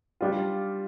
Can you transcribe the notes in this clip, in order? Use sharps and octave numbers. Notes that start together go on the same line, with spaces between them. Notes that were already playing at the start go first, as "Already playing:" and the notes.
G3 D4 F4